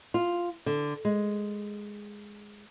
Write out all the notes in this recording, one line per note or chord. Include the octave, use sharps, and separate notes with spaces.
F4
D3
G#3